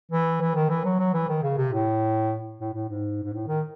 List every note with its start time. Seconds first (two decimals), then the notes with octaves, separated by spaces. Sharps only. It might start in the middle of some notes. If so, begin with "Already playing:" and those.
0.12 E3
0.41 E3
0.55 D#3
0.70 E3
0.85 F#3
0.99 F#3
1.14 E3
1.29 D#3
1.42 C#3
1.57 C3
1.72 A2
2.60 A2
2.74 A2
2.89 G#2
3.23 G#2
3.33 A2
3.47 D#3